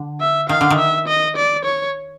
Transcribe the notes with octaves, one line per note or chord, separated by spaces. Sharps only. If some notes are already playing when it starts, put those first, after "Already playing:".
Already playing: D3
E5
D#3 F5
D3
D#3
E5
D#5
D5
C#5